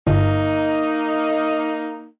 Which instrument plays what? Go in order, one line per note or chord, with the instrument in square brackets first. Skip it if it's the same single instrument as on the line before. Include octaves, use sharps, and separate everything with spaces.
[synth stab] G1 [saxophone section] A#3 D#4